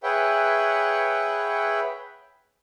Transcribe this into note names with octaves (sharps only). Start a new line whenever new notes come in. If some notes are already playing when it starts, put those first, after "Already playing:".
G#4 B4 C#5 E5 F#5 G5